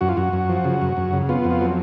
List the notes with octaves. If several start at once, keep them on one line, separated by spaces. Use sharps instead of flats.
F#2 F#4
F4
F#2 F#4
F#2
F3
C#3
F#2
F#2
C#3
B3 F4
F2
F4
F#3